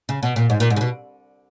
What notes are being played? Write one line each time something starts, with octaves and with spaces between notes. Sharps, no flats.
C#3
B2
A#2
G#2
A#2
G#2
C#3
B2